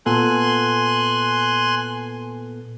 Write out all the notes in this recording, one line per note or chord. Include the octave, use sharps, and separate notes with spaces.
A#2 B3 A4 G#5 C6 F#6